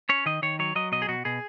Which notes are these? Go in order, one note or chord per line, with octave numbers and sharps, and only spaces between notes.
C#4 C#5
D#3 D#5
D#3 C#5
F#3 C#5
F#3 D#5
B2 D#5
G#4
B2 F#4
B2 G#4